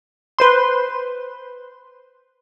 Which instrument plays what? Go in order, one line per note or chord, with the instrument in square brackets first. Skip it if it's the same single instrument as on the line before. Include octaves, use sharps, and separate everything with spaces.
[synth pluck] B4 C5 C6